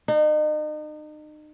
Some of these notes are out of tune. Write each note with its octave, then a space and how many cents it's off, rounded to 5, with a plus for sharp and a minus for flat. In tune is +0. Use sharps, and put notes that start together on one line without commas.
D#4 -35